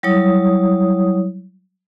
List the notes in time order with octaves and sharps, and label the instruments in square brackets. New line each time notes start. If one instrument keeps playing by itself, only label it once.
[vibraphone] F#3 G3 E4 C#5 D#6